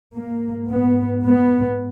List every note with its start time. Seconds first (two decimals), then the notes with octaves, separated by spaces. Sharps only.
0.15 G#2 A#3
0.70 B3
1.25 B3